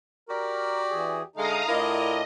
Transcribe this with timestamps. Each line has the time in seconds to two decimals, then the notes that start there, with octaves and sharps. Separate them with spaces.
0.29 F#4 G4 A#4 D5
0.90 E2 G#4
1.36 D3 G#3 A3 D#4 F5 A#5 D#6
1.68 A2 D4 E4 F4 A#4 D#5